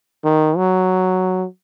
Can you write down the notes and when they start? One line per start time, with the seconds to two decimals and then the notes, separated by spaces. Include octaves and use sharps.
0.24 D#3
0.57 F#3